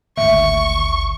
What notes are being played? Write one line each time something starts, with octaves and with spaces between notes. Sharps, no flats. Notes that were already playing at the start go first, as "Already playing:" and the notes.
G#1 D2 E5 C#6